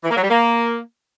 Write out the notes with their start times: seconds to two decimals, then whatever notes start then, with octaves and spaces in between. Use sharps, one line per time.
0.04 E3
0.10 A#3
0.17 F#3
0.23 G3
0.29 A#3